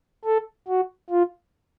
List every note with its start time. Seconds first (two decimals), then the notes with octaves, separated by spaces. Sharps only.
0.25 A4
0.68 F#4
1.10 F4